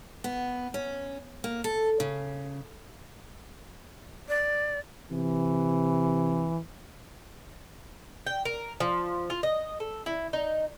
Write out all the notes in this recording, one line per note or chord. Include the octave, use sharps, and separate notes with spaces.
B3
C#4
A#3
A4
C#3
D5
C3 E3
G5
A#4
F3
F4
D#5
A4
E4
D#4